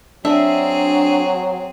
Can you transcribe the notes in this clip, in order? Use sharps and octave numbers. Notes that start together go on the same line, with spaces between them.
F#3 C4 D4 G#4 E5